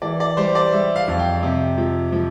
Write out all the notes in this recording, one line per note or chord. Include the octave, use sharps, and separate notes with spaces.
E3 D5
D5
G3 C5
D5
G3 E5
F5
F2
G5
C3
F3
F3